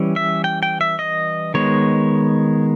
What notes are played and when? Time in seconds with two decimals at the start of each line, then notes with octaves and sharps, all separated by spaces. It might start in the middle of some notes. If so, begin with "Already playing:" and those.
Already playing: E3 G3 C#4
0.16 E5
0.44 G5
0.63 G5
0.81 E5
0.99 D#5
1.54 D#3 G#3 B3 C#5